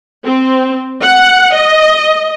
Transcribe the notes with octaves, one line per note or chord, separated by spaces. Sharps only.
C4
F#5
D#5